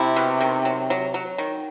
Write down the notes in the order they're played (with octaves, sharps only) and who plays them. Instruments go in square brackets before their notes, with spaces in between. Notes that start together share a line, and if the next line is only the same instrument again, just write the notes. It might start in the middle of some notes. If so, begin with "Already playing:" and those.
Already playing: [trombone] C3 [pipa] E4
[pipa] B2
D#3
F#3
F#3
F#3
D#3